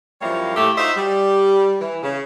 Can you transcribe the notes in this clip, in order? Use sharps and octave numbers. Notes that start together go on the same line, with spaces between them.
F#2 F3 G3 A#3 E4 C#5
A2 A3 G4
D#4 F4 F#4 C5 D#5 E5
G3
E3
C#3